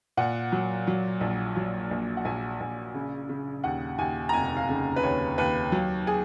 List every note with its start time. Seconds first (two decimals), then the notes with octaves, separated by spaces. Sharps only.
0.17 A#2 F#5
0.52 F#3
0.87 F#3
1.21 A#1
1.56 F#3
1.91 A#1
2.17 F#5
2.25 A#1 G#5
2.60 A#1
2.94 C#3
3.29 C#3
3.64 D#2 F#5
3.98 D#2 G#5
4.29 A#5
4.33 F1 G#5
4.57 F5
4.69 C#3
4.96 B4
5.03 D#2 C#5
5.38 D#2 B4
5.72 F#3
6.07 G#4